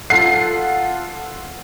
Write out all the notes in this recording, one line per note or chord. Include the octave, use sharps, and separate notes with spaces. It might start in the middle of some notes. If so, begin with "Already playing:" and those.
F4 A4 F#5 C7